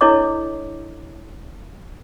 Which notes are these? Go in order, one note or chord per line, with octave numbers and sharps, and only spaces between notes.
D4 E4 A4 C#5 D#5 D6